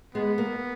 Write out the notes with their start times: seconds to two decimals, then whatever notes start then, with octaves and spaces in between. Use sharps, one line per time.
0.15 G#3 B3
0.38 A#3